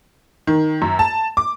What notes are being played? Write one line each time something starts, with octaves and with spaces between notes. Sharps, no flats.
D#3
F#2
A5
D6